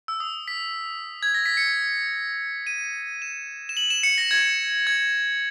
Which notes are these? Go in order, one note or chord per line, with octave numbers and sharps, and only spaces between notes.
E6
D#6
B6
G#6
A#6
B6
C#7
D#7
E7
E7
F#7
E7
C#7
A#6
G#6
G#6